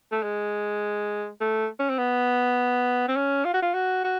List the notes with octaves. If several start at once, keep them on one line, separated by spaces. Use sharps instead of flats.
A3
G#3
A3
C#4
C4
B3
C4
C#4
F4
F#4
F4
F#4
F#4